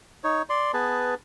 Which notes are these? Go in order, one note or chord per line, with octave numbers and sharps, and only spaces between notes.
D#4 C#5
D5 C6
B3 G#4 B4 A5